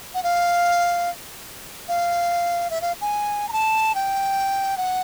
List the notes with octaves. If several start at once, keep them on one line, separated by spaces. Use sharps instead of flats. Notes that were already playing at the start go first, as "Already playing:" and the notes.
F#5
F5
F5
E5
F5
G#5
A#5
A5
G5
F#5